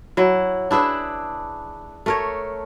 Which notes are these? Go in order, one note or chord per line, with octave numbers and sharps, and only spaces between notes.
F#3 E4
D4 E4 G#4 B4
A3 A#4 C#5